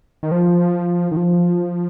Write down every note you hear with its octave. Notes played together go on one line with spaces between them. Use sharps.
D#3
F3
D#3
F3